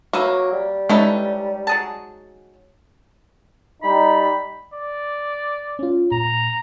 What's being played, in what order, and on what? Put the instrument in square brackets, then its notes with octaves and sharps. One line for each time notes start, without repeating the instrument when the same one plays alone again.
[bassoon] F#3 [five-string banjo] A#3 [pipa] B4 E5 C#6
[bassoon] G3
[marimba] G#3 [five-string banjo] C#4 D#4 B4 [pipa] E4 A4
[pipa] F#3 G#4 A5
[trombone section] G3 D#4 [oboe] B5
[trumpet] D5
[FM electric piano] C#4 F4
[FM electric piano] A#2 [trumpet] A#5